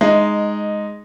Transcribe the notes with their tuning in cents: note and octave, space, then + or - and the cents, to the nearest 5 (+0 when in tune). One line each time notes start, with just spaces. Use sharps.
G#3 +0 D#4 -5